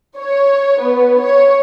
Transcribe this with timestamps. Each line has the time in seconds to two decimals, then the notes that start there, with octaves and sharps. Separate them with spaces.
0.18 C#5
0.80 B3
1.20 C#5